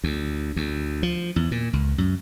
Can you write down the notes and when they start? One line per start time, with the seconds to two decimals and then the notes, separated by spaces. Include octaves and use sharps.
0.04 D2
0.56 D2
1.03 F3
1.36 E2
1.51 A#2
1.73 C#2
1.98 F#2